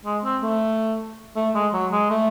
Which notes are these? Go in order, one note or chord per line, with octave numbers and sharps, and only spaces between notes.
G#3
C4
A3
A3
G#3
F#3
G#3
A3